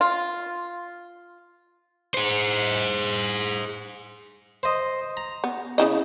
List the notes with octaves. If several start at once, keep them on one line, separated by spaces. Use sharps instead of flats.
F4
G#4 C5
C5 D#5
A#5
B3
C#3 E4 D#5